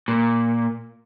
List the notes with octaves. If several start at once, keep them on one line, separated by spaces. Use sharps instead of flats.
A#2